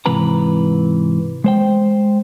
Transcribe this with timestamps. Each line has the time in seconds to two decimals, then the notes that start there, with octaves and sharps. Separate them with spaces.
0.06 G#2 C3 E3 B4 A#5
1.44 G#3 C5 G5